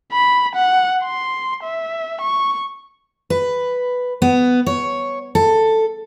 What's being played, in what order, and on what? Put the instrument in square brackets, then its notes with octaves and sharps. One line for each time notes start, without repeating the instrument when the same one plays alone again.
[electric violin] B5
F#5
C6
E5
C#6
[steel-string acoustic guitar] B4
B3
C#5
A4